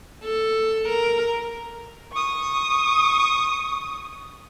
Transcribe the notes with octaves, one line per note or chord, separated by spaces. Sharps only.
A4
A#4
C#6 D#6